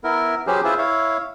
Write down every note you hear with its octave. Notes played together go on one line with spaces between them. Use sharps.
B3 E4 A#4
F#3 C#4 G4 G#4 B4 C5
E4 F4 G#4 B4 C5 E5
E4 C#5 F5